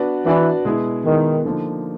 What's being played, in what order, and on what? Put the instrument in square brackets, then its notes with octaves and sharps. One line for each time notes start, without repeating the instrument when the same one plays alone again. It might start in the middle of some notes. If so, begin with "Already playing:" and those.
Already playing: [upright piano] B3 D4 F#4 B4 D5
[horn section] E3 [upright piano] B3 D4 F#4 B4 D5
[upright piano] B2 G#3 B3 E4 G#4
[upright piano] B2 G#3 B3 E4 G#4 [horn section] D#3
[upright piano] D3 F3 A#3 D#4